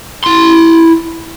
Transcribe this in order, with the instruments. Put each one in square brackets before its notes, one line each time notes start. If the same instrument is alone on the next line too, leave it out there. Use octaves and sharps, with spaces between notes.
[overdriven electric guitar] E4 C6